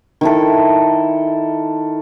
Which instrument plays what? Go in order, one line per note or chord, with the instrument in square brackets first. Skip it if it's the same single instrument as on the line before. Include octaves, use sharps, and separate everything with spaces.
[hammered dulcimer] D#3 E4 A4